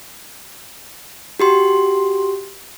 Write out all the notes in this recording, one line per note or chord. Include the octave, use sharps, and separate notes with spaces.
F#4 G4 C6